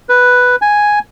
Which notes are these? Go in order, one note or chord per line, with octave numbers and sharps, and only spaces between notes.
B4
G#5